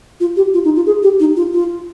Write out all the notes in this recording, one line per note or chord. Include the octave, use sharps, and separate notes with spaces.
F4
G4
F4
D#4
F4
G#4
G4
D#4
F4
F4